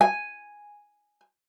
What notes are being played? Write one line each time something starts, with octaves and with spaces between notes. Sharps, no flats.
G#5